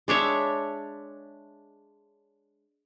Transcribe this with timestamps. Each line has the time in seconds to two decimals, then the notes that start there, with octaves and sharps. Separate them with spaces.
0.08 G#3 D4 C#5 E5